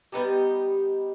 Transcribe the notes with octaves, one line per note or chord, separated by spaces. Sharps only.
G3 B3 D#4 G4